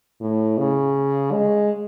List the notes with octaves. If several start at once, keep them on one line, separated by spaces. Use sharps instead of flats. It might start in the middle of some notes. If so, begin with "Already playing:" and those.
A2
C#3
G#3